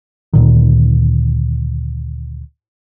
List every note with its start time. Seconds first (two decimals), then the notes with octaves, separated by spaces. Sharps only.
0.33 D2 A#2 D#3